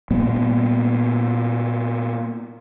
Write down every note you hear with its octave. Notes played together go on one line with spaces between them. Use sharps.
A#2 G3 A#3 B3